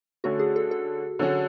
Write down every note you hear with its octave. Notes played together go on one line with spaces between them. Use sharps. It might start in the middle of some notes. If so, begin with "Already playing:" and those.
D3 A3 C#4 F#4
G#4
A4
A4
D3 F#3 C#4 F#4